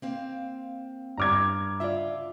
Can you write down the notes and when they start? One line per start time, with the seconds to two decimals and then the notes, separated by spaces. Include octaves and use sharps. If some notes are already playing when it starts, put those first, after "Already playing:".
0.02 A#3 C4 F5
1.18 G2 A#5 D6 F6 G#6
1.80 C#3 F4 D5 E5